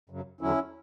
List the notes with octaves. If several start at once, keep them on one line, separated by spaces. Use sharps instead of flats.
F#2 C#3 F#3
E2 D3 F#3 C#4 E4